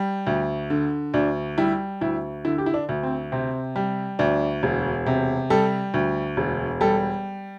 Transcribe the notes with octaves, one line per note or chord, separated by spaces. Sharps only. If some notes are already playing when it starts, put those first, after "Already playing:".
Already playing: G3
D2
D3
D2 D4
G3 E4
D2 E4
D3 E4
G4
E4
D4
D2
C4
C3 C4
G3
D2 D4
E1
C3
G3 A4
D2
E1
G3 A4